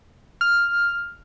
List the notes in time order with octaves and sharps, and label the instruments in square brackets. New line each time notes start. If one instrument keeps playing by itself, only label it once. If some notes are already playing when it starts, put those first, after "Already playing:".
[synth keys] F6